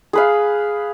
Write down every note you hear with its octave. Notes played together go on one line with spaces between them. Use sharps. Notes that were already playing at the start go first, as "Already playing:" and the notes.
G#4 B4 F5